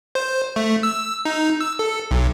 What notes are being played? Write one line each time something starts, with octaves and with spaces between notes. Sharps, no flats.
C5
A3
E6
D#4
E6
A4
B1